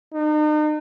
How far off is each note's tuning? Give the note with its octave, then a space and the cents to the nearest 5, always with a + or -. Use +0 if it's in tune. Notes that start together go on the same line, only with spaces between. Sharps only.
D#4 -40